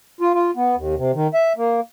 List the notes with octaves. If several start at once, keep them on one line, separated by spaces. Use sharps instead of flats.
F4
F4
B3
D#2
C3
D#3
E5
A#3